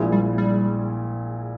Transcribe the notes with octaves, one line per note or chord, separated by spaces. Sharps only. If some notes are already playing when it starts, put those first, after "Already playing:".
Already playing: A#1 A#2 G#3 E4 G#4
G3
G3